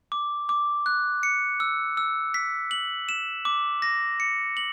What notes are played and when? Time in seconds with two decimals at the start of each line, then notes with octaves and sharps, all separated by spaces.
0.12 D6
0.49 D6
0.86 F#6
1.23 C#7
1.60 E6
1.97 E6
2.34 B6
2.71 F#7
3.09 E7
3.45 D6
3.82 A#6
4.20 C#7
4.57 F#7